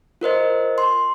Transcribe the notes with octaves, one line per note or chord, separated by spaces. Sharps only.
F4 A#4 C5 D#5
C6